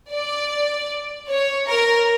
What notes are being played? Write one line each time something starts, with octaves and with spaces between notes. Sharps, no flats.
D5
C#5
A#4